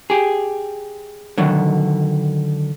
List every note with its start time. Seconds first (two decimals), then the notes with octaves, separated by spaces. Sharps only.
0.10 G4 G#4
1.38 D3 D#3 F#3